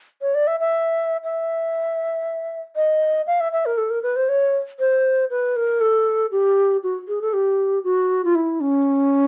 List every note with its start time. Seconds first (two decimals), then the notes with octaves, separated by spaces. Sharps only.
0.22 C#5
0.35 D5
0.47 E5
0.60 E5
1.24 E5
2.76 D#5
3.27 F5
3.40 E5
3.53 E5
3.66 A#4
3.78 A4
3.90 A#4
4.03 B4
4.16 C5
4.29 C#5
4.79 C5
5.30 B4
5.56 A#4
5.81 A4
6.32 G4
6.83 F#4
7.08 G#4
7.22 A4
7.33 G4
7.84 F#4
8.25 F4
8.35 E4
8.61 C#4